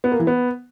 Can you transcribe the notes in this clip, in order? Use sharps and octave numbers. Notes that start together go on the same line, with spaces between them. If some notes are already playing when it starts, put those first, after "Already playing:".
B3
A#3
E3
B3